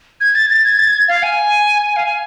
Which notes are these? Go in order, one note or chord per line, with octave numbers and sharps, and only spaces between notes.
G#6
A6
A6
G#6
A6
G#6
F5
G#5
F5
G#5